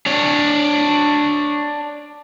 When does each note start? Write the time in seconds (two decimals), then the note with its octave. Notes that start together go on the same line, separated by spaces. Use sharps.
0.06 D4 C#5